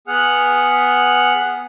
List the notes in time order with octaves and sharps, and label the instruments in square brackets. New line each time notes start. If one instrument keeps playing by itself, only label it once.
[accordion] B3 G#4 F#5 F6 F#6